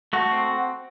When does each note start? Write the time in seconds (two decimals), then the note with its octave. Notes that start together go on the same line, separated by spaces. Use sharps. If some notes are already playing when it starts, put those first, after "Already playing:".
0.13 A3 F#4
0.31 C4